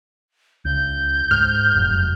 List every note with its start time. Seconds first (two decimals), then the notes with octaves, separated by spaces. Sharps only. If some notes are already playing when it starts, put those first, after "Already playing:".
0.65 C#2 G6
1.31 G#2 F6
1.74 F1 F#2